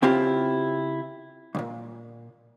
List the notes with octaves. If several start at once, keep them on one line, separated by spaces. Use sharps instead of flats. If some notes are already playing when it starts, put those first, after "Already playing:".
C#3 C4 E4 F4 G4
B1 A#2